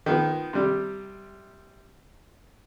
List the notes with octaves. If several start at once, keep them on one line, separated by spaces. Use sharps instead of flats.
D#3 F3 B3
C3 G3